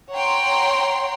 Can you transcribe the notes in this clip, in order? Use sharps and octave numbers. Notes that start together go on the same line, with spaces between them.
C#5 F#5 G5 A#5 C6